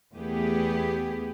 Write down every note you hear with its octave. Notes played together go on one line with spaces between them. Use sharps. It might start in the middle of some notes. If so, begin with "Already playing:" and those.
E2 A3 B3 G4 G#4